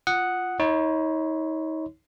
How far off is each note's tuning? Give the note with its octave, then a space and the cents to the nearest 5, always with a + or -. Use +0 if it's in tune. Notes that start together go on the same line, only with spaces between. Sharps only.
F4 +0 F#5 +0 D#6 +0
D#4 +35 C#5 +0 C6 -40